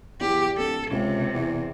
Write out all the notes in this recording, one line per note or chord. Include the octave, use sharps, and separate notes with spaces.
E2 G4
D1 A4
C#2 C3
E2